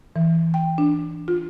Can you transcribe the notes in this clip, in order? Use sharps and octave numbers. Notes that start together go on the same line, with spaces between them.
E3
G5
D4
F4